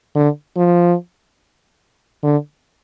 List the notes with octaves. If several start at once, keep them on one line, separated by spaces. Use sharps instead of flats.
D3
F3
D3